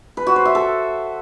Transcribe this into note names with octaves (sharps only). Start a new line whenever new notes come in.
B4
F#4
C5
E5
A4